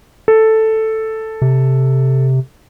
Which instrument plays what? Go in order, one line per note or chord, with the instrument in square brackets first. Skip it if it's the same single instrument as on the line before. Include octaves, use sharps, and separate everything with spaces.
[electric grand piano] A4
[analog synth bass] C3